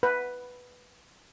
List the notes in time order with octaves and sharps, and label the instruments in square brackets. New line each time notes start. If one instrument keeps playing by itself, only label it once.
[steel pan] B4